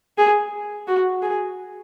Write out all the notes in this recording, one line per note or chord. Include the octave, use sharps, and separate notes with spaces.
G#4
F#4
G#4